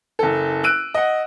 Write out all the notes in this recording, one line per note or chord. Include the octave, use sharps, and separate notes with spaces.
F#1 A4
E6 F#6 D7 D#7
D#5 F#5